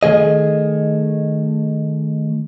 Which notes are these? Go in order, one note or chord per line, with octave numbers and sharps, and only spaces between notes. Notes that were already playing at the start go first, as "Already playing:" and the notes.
D#3 A3 G#4 D#5